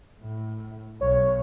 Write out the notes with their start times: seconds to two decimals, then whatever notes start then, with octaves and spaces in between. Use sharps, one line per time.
0.20 A2
1.01 B1 C#5